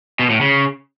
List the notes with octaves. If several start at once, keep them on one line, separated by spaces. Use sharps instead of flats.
B2
A2
C#3